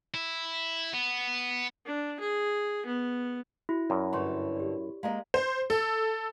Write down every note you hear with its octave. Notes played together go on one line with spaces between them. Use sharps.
E4
B3
D4
G#4
B3
E4 F#4
F#2 D5
G2 D3 C#5 C6 C#6
G4 D5
G#3 A#3 D#5 F5 A#5
C5
A4